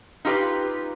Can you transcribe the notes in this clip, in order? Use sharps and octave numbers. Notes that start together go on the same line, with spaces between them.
D#4 F4 G4 B4